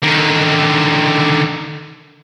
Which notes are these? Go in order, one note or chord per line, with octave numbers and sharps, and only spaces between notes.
D3 D#3